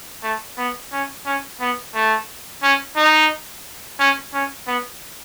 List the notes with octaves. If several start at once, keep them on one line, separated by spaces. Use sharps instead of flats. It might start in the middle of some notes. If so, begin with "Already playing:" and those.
A3
B3
C#4
C#4
B3
A3
C#4
D#4
C#4
C#4
B3